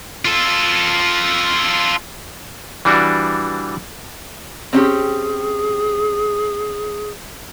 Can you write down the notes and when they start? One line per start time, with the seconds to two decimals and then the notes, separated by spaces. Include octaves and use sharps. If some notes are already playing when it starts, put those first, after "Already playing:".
0.25 F4 A4
2.85 E3 G3 D4 F#4
4.73 C4 C#4 G4 G#4